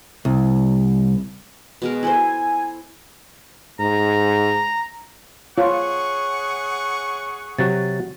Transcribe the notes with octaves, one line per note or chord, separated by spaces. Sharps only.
C2
B2 G#3 A#4
E4 A4 C5 G#5
G#2 A#5
F4 G#4 C#5 F#5 C#6
C3 F#3 F#4 A6